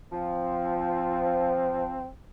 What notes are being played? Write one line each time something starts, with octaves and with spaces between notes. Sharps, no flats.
F3 C4